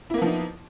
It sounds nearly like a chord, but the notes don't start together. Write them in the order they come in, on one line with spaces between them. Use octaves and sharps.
E4 A#3 B3 F3 D#4